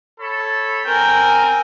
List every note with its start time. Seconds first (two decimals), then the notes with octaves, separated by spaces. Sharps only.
0.20 A4 C#5 B5
0.86 C4 A#4 G5 G#5